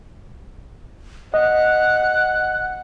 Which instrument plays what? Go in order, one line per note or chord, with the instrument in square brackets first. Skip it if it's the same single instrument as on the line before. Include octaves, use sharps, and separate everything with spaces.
[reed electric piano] D#5 [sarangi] F#5 [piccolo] F#6